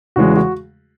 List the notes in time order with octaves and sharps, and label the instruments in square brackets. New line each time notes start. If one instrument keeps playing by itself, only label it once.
[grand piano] E2 C#3 E3 G#3 F#4
F#4